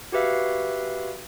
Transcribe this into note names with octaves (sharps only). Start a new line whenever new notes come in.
F#4 G4 B4 E5 F5